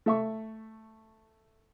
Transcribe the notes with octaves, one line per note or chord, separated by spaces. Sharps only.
A3 E5 C#6